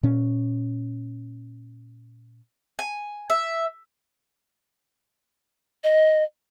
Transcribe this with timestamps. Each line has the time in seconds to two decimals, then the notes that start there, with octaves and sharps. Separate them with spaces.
0.03 A#2 C#4
2.79 G#5
3.30 E5
5.83 D#5